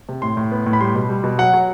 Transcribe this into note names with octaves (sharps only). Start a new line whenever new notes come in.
C3
A2 C6
A2
B3
A2
B5
G3 C6
B2
G3
B2
F#3 F#5
F#3